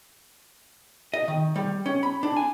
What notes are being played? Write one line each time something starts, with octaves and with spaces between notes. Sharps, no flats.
D#5
D#3
G3
C#4
B5
D4
G#5